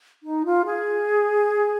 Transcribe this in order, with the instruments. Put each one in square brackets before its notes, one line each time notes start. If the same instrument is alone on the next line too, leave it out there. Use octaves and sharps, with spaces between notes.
[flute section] D#4
F4
G#4